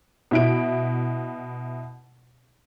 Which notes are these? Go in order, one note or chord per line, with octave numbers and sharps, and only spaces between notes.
B2 E4 D7